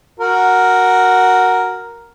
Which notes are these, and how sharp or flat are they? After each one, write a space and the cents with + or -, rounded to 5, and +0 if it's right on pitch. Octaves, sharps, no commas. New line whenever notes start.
F#4 +0 A#4 +0